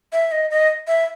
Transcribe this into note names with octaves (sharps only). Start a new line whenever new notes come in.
E5
D#5
D#5
E5